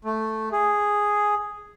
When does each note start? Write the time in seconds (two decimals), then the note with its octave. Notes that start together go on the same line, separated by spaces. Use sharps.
0.05 A3
0.52 G#4